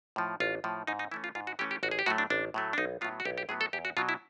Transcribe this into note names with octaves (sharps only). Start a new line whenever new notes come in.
A2 F3
A1 F4
A2 F3
G#2 D#4
D#4
E3 A3 C#4 E4
F4
G#2 F4
F#4
E3 A3 C#4 G4
G4
A1 F#4
G#4
G4
A2 F#3 A3 F#4
D4
A1 D4
A2 F#3 A3
D4
B1 D#4
A2 F#3 B3 F4
F#4
B1 G4
G4
A2 F#3 B3 G#4
A4
E2 G4
F#4
B2 F#3 F4
E4